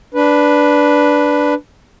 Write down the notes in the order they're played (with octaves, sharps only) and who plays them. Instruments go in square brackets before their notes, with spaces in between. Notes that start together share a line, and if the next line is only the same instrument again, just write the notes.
[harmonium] D4 B4